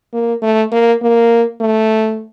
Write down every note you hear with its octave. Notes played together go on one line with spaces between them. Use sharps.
A#3
A3
A#3
A#3
A3